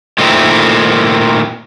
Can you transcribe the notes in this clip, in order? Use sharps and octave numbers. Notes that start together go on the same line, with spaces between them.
A#2 D#3 A3 C4 D#4 E4